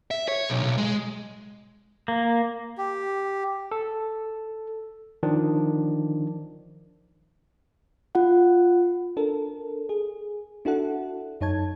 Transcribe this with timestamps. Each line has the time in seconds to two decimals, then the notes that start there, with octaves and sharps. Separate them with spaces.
0.11 E5
0.28 C#5
0.50 B1
0.63 B1
0.78 G#3
2.08 A#3
2.78 G4
3.72 A4
5.23 D#3 F3 D4
8.15 F4 F#5
9.17 D4 A4 A#4
9.89 G#4
10.65 D4 E4 F#4 A4 F#5
11.41 F#2 D#4 C#5 A5 G#6